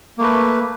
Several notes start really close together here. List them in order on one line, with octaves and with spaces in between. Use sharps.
A#3 A3 B4